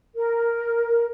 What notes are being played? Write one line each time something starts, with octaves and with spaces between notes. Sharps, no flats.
A#4